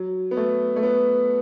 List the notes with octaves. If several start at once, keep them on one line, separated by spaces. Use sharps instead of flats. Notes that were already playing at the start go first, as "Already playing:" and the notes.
Already playing: F#3
B3
A3
A3
B3